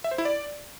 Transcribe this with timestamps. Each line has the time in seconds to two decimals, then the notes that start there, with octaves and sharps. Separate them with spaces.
0.04 E5
0.11 C5
0.18 E4
0.25 D5